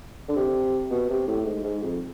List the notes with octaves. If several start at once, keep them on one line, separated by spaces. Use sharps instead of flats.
D3
C3
B2
C3
A2
G#2
G#2
F2